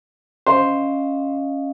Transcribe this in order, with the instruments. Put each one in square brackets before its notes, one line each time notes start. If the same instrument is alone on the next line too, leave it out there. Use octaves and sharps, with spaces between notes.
[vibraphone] C#4 D#5 F5 [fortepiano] C5